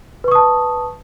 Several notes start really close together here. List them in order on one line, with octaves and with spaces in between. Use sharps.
B4 C#6 D#6 A5